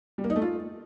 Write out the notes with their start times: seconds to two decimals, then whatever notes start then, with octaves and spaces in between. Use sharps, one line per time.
0.18 G3
0.24 A#3
0.30 D#4
0.36 A3
0.42 F4